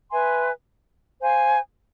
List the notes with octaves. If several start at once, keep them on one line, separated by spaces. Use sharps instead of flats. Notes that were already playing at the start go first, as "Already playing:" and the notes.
B4 E5 G#5 C6
C5 F5 G#5